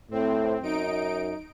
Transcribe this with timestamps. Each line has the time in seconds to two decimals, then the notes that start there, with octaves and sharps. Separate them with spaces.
0.11 A2 C4
0.63 F#2 D#4 D7